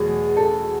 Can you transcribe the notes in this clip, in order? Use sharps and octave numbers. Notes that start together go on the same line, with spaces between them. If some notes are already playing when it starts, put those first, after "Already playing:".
Already playing: E2 B2 F#3 A3 G#4
A4